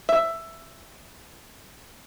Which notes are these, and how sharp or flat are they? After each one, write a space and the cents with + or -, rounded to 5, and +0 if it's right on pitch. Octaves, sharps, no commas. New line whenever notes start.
E5 +10